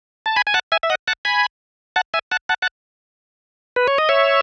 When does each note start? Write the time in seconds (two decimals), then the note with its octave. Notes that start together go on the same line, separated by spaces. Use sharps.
0.26 A5
0.36 G#5 B5
0.47 G#5
0.54 F#5 A5
0.72 E5 G#5
0.83 E5
0.90 D#5 F#5
1.08 F#5 A5
1.25 G#5 B5
1.96 F#5 A5
2.14 E5 G#5
2.31 F#5 A5
2.49 F#5 A5
2.62 F#5 A5
3.76 B4
3.88 C#5
3.98 D#5
4.09 C#5 E5